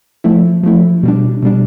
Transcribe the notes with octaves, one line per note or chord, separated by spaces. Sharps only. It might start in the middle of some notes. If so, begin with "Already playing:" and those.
F3 A3 E4
F3 A3 E4
B2 G3 D4
B2 G3 D4